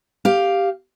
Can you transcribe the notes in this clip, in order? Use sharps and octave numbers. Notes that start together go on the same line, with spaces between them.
G4 F5